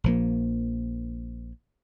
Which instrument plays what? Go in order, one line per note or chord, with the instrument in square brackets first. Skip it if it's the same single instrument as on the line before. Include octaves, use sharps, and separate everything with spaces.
[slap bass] A#1 F3 A#3